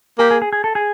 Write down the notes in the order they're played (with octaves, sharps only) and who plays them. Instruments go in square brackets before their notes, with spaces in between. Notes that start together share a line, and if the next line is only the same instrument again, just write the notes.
[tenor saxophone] A#3 [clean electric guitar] G4
[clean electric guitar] G#4
G#4
G#4
A4
G#4